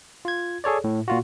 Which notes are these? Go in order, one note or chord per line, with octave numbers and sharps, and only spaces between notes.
F4 G#6
G#4 A4 C#5 D5
A2
A#2 F4 F#4